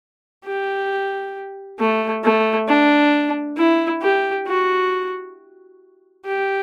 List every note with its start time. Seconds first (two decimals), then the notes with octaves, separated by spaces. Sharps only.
0.45 G4
1.79 A3
2.24 A3
2.69 D4
3.58 E4
4.03 G4
4.47 F#4
6.26 G4